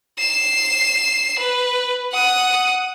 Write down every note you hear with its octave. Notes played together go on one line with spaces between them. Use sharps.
C7 E7
B4
F#5 D#6